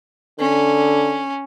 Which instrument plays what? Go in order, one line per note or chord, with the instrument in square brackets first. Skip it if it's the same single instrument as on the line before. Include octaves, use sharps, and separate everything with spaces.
[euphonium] D3 [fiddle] C#4